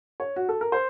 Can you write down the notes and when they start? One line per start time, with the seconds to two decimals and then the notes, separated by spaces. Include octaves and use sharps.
0.20 C#5
0.36 F#4
0.49 A4
0.61 A#4
0.72 C5